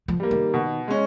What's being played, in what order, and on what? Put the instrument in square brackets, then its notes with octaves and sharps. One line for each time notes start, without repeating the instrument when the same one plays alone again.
[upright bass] F3
[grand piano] G3 A#3
[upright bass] D#3
[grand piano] B2
G#3 C#4